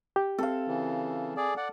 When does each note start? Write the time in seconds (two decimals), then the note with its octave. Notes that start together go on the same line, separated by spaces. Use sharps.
0.16 G4
0.38 C4 A4 F5
0.67 C#3 E3
1.37 G#4 D5
1.57 D5 F#5